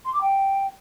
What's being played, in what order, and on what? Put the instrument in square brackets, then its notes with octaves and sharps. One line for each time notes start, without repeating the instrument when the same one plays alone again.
[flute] C6
D6
G5